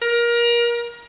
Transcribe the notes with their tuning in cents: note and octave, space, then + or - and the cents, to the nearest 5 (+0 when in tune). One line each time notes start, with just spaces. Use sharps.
A#4 +25